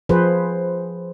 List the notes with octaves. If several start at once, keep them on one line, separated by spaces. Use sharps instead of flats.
F3 G#4 B4 C5